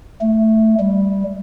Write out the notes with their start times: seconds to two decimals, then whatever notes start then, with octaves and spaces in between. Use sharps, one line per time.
0.21 A3
0.79 G3